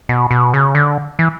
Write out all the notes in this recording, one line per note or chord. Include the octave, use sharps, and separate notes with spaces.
B2
B2
C#3
D3
E3